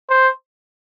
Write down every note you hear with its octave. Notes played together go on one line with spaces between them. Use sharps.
C5